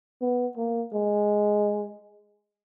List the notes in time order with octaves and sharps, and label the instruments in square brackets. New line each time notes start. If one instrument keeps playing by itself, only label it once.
[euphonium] B3
A#3
G#3